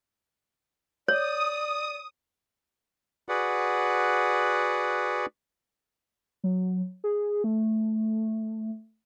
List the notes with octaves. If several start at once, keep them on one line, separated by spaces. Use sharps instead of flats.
C#5 D5 D#6
F#4 G#4 B4 D5 F#5
F#3
G#4
A3